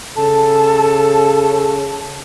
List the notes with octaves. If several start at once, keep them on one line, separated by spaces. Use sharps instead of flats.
C#3 A4 A5